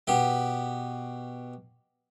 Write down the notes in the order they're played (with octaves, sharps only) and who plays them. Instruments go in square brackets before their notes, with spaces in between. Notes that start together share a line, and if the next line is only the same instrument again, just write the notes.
[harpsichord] B2 G4